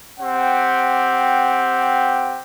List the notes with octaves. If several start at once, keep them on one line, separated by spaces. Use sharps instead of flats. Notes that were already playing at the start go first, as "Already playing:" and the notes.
C4 G4 F#5